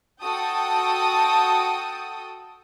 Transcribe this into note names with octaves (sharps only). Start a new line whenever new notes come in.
F#4 A4 G5 A5 D#6